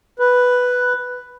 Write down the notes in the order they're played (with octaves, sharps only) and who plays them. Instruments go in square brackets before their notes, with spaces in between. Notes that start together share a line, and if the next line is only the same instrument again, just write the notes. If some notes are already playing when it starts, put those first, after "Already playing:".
[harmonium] B4